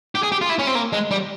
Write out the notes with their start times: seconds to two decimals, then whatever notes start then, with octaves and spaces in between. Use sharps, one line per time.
0.15 G4
0.23 G#4
0.32 G4
0.41 F4
0.49 E4
0.59 C#4
0.67 C4
0.75 A#3
0.93 G#3
1.11 G3